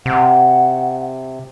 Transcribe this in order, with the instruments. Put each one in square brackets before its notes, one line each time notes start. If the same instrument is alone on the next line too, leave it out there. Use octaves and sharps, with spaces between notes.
[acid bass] C3 [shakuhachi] F#5